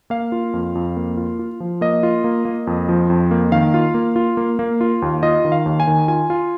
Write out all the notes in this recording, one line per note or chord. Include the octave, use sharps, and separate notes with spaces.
A#3 F5
F4
F2
F2
A#3
F4
F4
F3
A#3 D#5
F4
A#3
A#3
F2
F3
F2
A#3
D#3 F5
F4
A#3
F4
A#3
A#3
F4
D#2
F4 D#5
D#3
F5
D#2
G#5
D#3
F4 G#5
F4